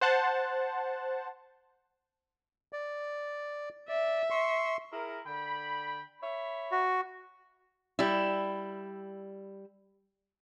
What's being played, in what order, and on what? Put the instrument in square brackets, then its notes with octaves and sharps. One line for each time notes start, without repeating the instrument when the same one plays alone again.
[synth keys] C5 F#5 A5
[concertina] D5
[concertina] D5 [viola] E5
[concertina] C6 C#6
[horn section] E4 G#4 A#4
D3 G5 B5
C#5 E5 B5
[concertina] F#4
[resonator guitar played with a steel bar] G3 E4